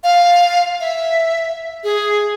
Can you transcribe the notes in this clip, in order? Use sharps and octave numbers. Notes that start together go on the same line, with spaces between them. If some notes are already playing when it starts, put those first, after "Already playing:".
F5
E5
G#4